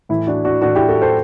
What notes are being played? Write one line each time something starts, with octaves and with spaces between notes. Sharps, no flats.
A2 E3 E4
D4 F#4
D4 F#4
A2 E3 D4 F#4
E4 G4
F#4 A4
A4 C5